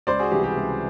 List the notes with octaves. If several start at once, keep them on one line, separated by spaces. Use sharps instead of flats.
C#2 C5 D5
F#4 G#4
C3 E3 G3 G4
G4
C#2